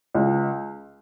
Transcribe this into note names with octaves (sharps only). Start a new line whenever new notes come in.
C#2